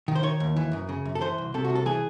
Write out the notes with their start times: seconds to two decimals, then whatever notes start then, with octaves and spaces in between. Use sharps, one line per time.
0.08 D#3
0.15 C5
0.23 D#3 C#5
0.40 D#2
0.56 E3
0.73 F#2
0.89 C#3
1.05 F#2
1.15 A4
1.21 E3 C5
1.38 C2
1.54 C3 A4
1.64 F#4
1.70 C2
1.75 A4
1.86 E3 G#4